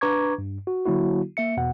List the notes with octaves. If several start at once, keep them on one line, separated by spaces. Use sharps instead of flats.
D4 B4 A#5 C#6 D6 G#6
G2
F#4
D3 F#3 A#3 E4 F#4
A#3 E5 C#7
E2 B2 F#5